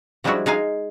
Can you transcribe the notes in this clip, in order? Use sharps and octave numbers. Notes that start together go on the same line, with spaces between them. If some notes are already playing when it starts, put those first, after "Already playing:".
F3 G3 G#3 D4 E4 F#4
G#3 D#4 F5 G#5